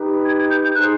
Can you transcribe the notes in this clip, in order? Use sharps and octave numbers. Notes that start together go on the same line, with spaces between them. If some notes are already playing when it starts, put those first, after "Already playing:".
Already playing: D#4 G4 B4
G#6
G#6
G6
G6
D#4 G#4 C5 F#6